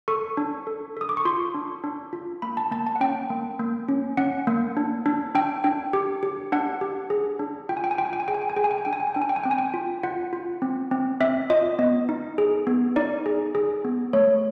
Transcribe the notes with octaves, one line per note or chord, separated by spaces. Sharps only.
A4 C#6
D4
A4
A4 D#6
D6
C#6
F4 C6
D4
D4
F4
A#3 B5
A5
A#3 A5
A5
F#5
C#4 G5
A#3
A#3
C#4
C#4 F#5
A#3
D4
D4
D4 G5
D4 G5
G4
G4
D4 F#5
G4
G#4
D4
F4 G5
G#5
G5
G#5
F4 G5
G#5
G5
G#5
G#4 G5
G#5
G5
G#5
G#4 G5
G#5
G5
G#5
D4 G5
G#5
G5
G#5
D4 G5
G#5
G5
G#5
C4 G5
G#5
G5
F4
F4 F#5
F4
C4
C4
C4 E5
F4 D#5
B3 D#5
D#4
G#4
B3
D#4 D5
G#4
G#4
B3
A3 C#5